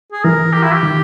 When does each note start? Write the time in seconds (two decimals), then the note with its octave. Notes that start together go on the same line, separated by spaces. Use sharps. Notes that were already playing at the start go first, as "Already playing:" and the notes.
0.12 G#4
0.24 E3 A#4
0.53 G4
0.63 E4
0.73 G4
0.83 D#3